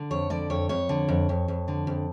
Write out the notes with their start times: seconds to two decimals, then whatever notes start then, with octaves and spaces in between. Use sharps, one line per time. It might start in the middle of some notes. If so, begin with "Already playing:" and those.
Already playing: D3
0.11 F2 C#5
0.30 D3 D5
0.50 F2 C#5
0.69 F2 C#5
0.89 D3
1.09 F2
1.29 F2
1.48 F2
1.68 D3
1.87 F2